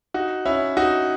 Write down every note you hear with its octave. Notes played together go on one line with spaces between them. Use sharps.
D#4 F#4
C#4 E4
D#4 F#4